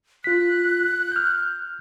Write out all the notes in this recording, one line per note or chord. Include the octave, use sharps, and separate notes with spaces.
F4 F#6 B6
F6 G6